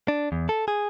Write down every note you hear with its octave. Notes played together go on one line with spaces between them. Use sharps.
D4
E2
A4
G#4